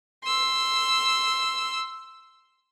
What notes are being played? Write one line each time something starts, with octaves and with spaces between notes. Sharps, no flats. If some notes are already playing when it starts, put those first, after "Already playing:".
C6 E6